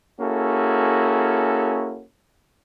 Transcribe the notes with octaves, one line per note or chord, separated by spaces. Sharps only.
A#3 C#4 E4 F#4 G#4 A4